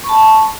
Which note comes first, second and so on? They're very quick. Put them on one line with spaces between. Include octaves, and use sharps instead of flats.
C#6 B5 A5